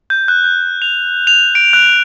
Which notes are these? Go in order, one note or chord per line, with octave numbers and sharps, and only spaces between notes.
G6
F#6
G6
F7
F7
D7
F#6